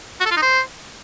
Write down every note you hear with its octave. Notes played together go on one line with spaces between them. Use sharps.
F#4
A4
F4
D#4
C5